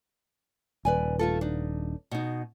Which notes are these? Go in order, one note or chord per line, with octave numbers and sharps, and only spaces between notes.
D#1 B4 D5 G#5
A3 F4 A4
D4 D#4
B2 D#4